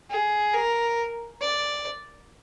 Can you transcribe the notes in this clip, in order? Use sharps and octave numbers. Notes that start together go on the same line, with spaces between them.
G#4
A#4
D5